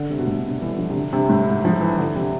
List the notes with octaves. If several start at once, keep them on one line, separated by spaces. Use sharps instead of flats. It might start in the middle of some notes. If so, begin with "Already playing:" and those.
Already playing: D3
C3
B2
A2
C3
E3
E3
F3
C3
D3
C3
A2
G#2
F3
E3
D3
C3